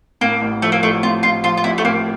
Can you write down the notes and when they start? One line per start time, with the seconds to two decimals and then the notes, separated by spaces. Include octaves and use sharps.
0.21 A2 A#3
0.42 A1
0.62 F3 A3
0.72 A#3
0.83 A1 A3
1.03 A2 F4
1.23 A1 F4
1.44 F3 F4
1.57 F4
1.64 A1 E4
1.78 A3
1.84 A2 A#3